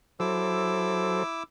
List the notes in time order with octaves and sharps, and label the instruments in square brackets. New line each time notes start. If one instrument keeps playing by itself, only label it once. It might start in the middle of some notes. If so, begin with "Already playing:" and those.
[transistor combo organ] F#3 A4 C5 [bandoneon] E4 D6 E6